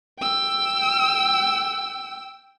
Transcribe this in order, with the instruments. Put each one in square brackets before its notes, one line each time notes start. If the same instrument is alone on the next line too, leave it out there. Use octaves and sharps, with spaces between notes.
[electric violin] G5 E6